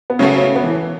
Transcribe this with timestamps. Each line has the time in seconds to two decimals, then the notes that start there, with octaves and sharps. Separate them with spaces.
0.10 B3
0.19 C#3 F#3 A3 C#4
0.38 C#4
0.56 B3
0.64 E3